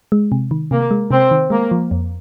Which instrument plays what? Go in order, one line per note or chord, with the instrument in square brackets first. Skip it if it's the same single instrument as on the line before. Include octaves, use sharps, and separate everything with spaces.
[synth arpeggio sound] G#3
C3
D#3
[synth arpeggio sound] C3 [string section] A#3
[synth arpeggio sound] G#3
[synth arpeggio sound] C3 [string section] C4
[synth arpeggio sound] D#3
[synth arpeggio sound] G#3 [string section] A#3
[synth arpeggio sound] F3
F2